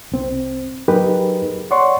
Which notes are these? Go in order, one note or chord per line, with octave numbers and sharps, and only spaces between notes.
C2 C4
F#3 D#4 G4 G#4 A#4 B4
C#5 D5 F#5 C6 C#6